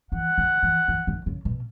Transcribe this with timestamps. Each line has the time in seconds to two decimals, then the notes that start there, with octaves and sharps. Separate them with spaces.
0.12 E3 F#5
0.38 D#3
0.63 E3
0.88 E3
1.07 D#3
1.26 C#3
1.45 B2